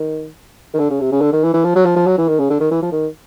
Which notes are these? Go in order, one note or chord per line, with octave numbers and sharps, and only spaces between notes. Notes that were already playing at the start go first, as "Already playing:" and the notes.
Already playing: D#3
D#3
D3
C#3
C3
C#3
D3
D#3
E3
E3
F3
F#3
F3
F3
F#3
E3
D#3
C#3
D3
D#3
E3
F3
D#3